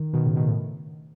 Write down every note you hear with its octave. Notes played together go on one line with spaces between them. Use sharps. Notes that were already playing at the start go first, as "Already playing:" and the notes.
Already playing: D#3
B2 D#3
A2 C#3
B2 D#3
A2